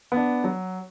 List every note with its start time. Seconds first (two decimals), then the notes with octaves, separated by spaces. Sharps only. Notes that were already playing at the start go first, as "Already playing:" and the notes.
0.12 B3 D4
0.44 F#3